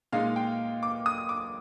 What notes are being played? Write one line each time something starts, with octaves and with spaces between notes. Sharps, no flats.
A#2 G#3 D#4 F5
G5
D6
D#6
D6